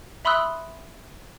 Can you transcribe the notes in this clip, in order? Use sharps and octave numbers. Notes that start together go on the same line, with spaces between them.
E5 B5 C6 D#6 E6 F#6